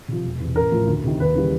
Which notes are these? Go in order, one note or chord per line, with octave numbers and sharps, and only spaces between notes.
C3 F3
E1
E2 C3
A1 A#4
A2 F3
D2
C3 D#3
D#2 B4
C#3 E3 G3